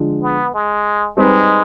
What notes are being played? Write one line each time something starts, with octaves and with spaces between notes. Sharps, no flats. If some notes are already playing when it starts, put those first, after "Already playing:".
Already playing: D3 F3 G#3
B3
G#3
G3 G#3 C4 D#4 G4 B4